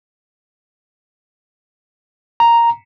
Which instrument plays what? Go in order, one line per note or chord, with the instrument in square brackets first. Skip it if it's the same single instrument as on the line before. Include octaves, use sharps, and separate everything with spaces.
[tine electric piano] A#5